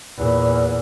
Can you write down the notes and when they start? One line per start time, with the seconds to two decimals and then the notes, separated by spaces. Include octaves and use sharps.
0.17 E2 A#2